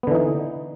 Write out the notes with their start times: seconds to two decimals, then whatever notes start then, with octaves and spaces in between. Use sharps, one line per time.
0.03 B3
0.07 D3
0.11 E3
0.15 D#4